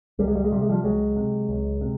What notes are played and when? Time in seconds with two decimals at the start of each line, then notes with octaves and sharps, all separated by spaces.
0.19 C#2 G3
0.28 G#3
0.36 G3
0.44 G#3
0.51 C3 G3
0.61 G#3
0.69 F3 G3
0.84 C#2 F#3 G#3
1.16 C3
1.49 C#2
1.81 C3